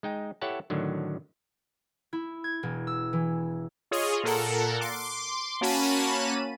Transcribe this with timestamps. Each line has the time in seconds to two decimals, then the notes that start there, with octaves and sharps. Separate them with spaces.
0.03 G#3 D#4 G5
0.41 E4 G4 A4 C#5 F#5 A5
0.70 A2 D3 D#3 F#3
2.13 E4
2.44 G#6
2.63 E1
2.87 E6
3.13 E3
3.91 F4 G#4 C#5 D#5
4.24 A#2 A4 A#4 F#5
4.81 C6 D6
5.61 A#3 C#4 F#4 A5 B5 D#7